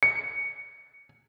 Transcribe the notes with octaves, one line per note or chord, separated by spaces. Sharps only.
C#7